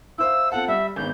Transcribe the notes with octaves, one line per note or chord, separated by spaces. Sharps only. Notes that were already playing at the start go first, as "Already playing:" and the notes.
E4 C5 F5 E6
C4 F4 A4 F#5
G3 E5
G#1 G#2 B3 G6